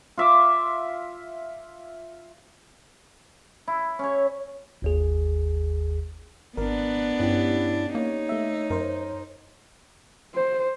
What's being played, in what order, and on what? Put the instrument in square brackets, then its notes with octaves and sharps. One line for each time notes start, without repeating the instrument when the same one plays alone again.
[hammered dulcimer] F4 E5 D6
E4
C#4 C#5
[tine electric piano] G1 D#2 G#4
[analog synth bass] G#1 [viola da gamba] B3 D4 [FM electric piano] A#4
[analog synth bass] G2 [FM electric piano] C#4 G4 [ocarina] E4
[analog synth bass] A#3 [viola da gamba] D#4 [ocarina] C#5
[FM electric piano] A3 E5
[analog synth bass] F#2 [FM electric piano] A#4 C5
[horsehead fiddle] C5